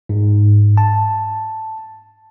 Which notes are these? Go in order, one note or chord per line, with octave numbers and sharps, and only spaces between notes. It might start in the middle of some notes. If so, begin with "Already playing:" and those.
G#2
A5